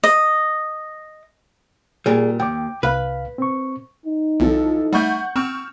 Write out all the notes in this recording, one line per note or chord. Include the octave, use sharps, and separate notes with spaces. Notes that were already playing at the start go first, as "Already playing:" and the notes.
D#5
A#2 G3 G#4
D#2 G5 D6
C2 B4 F5
C4 C#6
D#4
B1 E3 F3 A4
G3 A3 F#5 C#6 G6
C4 C#6 F6 E7